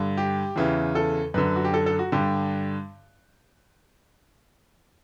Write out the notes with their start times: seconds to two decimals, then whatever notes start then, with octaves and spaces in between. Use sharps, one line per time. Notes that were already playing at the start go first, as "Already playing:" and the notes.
Already playing: G2 D3
0.17 G4
0.56 E2 C#3 E3
0.95 A4
1.34 F#2 D3 B4
1.56 F#4
1.65 G4
1.74 A4
1.86 A4
1.99 F#4
2.12 G2 D3 G4